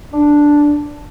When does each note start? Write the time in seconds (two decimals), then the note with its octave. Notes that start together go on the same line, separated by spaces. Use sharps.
0.13 D4